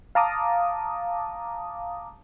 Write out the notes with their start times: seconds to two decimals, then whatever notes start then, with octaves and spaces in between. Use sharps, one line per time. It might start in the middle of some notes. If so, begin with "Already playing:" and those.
0.15 F5 A5 A#5 D6 D#6